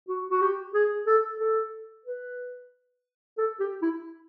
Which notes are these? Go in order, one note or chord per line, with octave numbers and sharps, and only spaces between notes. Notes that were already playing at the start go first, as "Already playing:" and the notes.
F#4
F#4
G4
G#4
A4
A4
B4
A4
G4
E4